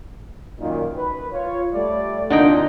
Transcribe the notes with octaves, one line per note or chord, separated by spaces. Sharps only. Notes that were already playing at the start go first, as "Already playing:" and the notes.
F#2 A#2 D#3
B4
F4 C#5
G3 A3 D5
C2 A#2 D3 D#4 G5